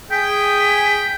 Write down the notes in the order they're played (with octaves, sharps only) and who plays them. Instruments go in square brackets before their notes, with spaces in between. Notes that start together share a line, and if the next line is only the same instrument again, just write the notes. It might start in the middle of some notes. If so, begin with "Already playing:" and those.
[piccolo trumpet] G#4 [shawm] G5 [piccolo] B6